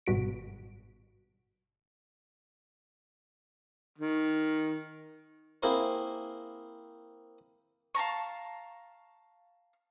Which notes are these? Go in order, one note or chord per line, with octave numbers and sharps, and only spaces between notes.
G#1 G2 B2 F#4 B6 D7
D#3
A#3 C4 E4 G#4 A#4 C5
F5 A5 A#5 C#6